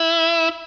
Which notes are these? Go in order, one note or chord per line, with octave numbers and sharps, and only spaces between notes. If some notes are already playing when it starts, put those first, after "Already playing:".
Already playing: E4